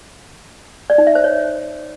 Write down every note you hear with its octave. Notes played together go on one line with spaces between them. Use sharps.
D5
D#4
E5
C5
C#5